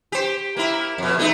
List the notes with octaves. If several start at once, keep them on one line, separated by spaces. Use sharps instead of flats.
G4 C5
A#3 E4
F2 B2
E2 A3 D#4